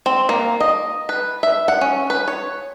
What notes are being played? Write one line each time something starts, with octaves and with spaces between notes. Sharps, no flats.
C4
A#3
D#5
B4
E5
F#5
C#4
B4
C#5